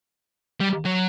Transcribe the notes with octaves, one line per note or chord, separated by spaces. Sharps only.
G3
F#3